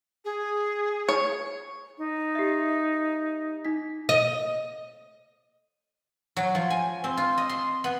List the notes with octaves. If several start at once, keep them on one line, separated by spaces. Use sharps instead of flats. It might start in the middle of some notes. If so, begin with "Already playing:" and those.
G#4
C#5
D#4
G4 E5
D#4 B6
D#5
F#3
F3
G#5
C4
F4
D#5
C6
B3